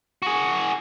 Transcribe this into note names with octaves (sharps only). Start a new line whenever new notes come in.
F#4 G#4